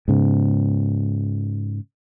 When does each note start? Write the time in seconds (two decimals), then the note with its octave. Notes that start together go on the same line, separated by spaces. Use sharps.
0.08 G#2 C#3